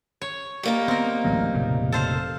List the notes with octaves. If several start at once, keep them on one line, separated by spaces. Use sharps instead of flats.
C#5
G3 A#3 D#4
B3 C4 A#4
A1 D2 F#3
F1 A#2 C#3
A4 C5 F5